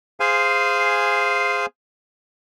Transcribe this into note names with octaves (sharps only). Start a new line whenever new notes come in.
G#4 C5 F5 G#5